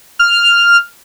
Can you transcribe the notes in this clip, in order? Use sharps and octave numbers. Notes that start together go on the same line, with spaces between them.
F6